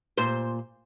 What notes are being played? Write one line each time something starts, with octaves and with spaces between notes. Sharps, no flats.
A#2 C5